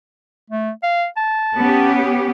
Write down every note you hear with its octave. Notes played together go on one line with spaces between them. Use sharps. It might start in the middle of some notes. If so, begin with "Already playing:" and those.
A3
F5
A5
B3 C#4 G4